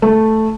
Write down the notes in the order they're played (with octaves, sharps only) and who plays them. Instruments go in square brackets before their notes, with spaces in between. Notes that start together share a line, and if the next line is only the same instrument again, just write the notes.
[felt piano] A3